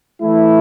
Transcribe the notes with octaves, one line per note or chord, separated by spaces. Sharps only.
E3 A3 E4